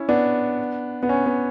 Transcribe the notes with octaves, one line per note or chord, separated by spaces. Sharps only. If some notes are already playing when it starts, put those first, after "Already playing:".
Already playing: C#4 E4
B3 D4
B3
C#4
B3